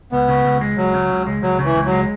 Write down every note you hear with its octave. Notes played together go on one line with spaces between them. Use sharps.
C#2 B3
C#3
C#2
G#3
C#2 F#3
C#3
C#2
G#3
C#2 F#3
C#3
E3
C#2
F#3
G#3